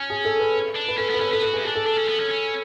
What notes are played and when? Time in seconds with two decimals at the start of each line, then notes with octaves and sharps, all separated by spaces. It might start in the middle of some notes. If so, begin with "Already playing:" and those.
Already playing: C#4 G#5
0.10 G#4
0.25 A4
0.40 B4
0.76 D4
0.88 B4
0.98 C#4 A4
1.10 B3 B4
1.20 C#4 A4
1.32 B3 A4
1.42 F#4 B4
1.53 G#4
1.56 C#4
1.65 D4 G#4
1.75 A4
1.86 D4
1.98 C#4
2.09 B3
2.20 C#4
2.31 C#4